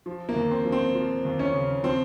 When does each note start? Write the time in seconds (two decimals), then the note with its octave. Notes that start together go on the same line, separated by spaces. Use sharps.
0.06 F3
0.29 A#3
0.36 D#2
0.51 C4
0.65 F3
0.72 C4
0.95 F3
1.25 D#2
1.39 C#4
1.54 C#3
1.84 F3 C4